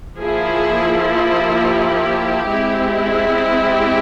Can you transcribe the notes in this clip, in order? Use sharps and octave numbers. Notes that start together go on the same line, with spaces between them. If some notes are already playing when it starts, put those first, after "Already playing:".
F3 A#3 E4 G#4
G4
G#3 C4 E4
G4